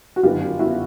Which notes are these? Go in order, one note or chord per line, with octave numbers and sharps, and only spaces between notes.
F#4
G1 F#2 D#3 F#3 B3 F4 G4
E4 F#4